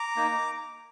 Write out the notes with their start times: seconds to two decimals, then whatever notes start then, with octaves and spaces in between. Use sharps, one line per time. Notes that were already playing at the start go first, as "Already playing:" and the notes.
Already playing: A#5 D6
0.16 A#3 D#4